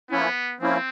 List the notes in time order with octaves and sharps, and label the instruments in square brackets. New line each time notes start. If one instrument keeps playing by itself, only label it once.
[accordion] F3 A#3 C#4 E4 [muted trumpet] B3
[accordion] F3 A#3 C#4 E4 [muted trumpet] C4